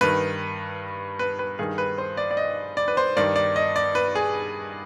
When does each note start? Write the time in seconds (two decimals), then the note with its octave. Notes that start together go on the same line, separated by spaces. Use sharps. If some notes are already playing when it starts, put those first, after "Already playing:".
0.01 G2 D#3 B4
1.19 B4
1.39 B4
1.59 G2 D#3 G#4
1.78 B4
1.98 C5
2.17 D5
2.31 D5
2.37 D#5
2.77 D5
2.88 B4
2.97 C5
3.16 G2 D#3 D5
3.36 D5
3.56 D#5
3.76 D5
3.95 B4
4.15 G#4